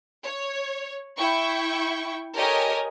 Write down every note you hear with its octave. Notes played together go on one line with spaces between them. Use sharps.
C#5
E4 G5 C#6
G4 A4 A#4 C#5 D#5 G#5